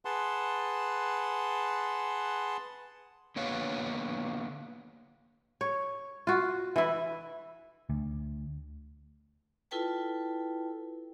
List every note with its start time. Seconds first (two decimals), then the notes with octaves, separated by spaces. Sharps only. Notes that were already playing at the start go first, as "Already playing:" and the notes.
0.05 G#4 B4 F#5 A5 C6
3.36 D3 A#3 B3 C#5 F5
5.61 C#5
6.27 F4 F#4
6.76 E3 E4
7.90 D2
9.71 E4 F4 A4 B4 G5 A5